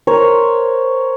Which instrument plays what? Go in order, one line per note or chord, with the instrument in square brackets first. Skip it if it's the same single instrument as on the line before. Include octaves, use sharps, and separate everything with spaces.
[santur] A#4 C5 C#5